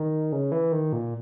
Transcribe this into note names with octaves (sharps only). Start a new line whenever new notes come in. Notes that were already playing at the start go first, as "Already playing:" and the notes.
Already playing: D#3
C#3
E3
D#3
A#2